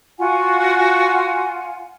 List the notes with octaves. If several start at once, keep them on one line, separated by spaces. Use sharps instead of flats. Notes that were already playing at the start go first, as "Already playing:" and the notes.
F4 F#4 F#5 G#5